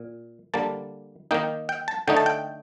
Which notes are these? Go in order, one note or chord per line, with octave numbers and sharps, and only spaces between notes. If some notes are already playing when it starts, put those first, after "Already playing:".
Already playing: A#2
D3 G3 A#3 A5
D#3 A#3 D#4 G5
G5
A5
D3 A3 D#4 G5
A5
G5